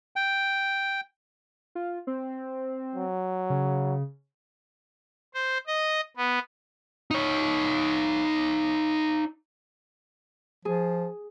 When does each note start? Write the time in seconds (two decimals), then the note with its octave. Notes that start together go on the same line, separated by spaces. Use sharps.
0.16 G5
1.75 F4
2.07 C4
2.96 F#3
3.50 C#3
5.34 C5
5.67 D#5
6.16 B3
7.11 D#4 C#5
10.65 F3 G#4